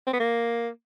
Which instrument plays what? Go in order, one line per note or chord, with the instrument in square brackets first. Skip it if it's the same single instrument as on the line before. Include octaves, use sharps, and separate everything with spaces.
[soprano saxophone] C4
B3
A#3